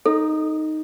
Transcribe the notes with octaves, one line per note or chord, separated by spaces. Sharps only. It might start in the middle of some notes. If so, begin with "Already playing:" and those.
D#4 A4